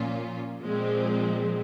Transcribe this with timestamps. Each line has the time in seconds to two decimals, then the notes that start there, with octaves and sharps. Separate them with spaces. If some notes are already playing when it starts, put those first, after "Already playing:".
Already playing: A#2 F3 A#3 C#4 F4
0.61 A#2 F3 G#3 C4